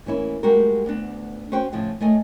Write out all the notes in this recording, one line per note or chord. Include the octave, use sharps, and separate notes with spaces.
E3 A#3 C#4 E4
G3 G#3 F#4 G4 A#4
D2 B3 D4
C#4 F#4 C5 G5
A2 C#3 F3 E4
A3 C#5 D#5 G#5